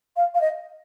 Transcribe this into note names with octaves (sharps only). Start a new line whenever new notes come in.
F5
F5
D#5